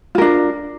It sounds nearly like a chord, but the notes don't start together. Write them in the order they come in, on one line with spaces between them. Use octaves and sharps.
F4 A#4 D4